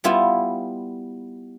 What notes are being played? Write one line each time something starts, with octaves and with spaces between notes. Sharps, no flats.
G3 B3 E4 F4